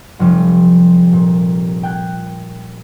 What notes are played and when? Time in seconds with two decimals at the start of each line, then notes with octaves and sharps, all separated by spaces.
0.19 F1 F3 G3
1.12 A#2
1.83 G5 F#6 G#6